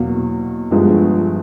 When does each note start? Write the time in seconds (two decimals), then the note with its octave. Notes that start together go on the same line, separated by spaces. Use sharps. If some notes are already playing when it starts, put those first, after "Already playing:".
Already playing: E2 B2 F#3 A#3
0.71 G1 G2 D3 F3 G#3